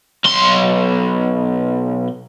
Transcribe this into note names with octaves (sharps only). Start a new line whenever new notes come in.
B1 C6